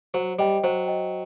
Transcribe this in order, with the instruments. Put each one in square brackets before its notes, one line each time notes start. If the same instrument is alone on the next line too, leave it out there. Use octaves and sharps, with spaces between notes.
[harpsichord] F#3 [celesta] C5
[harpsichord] G3 [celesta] D#5 G5
[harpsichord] F#3 [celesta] C5
[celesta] D#5 G5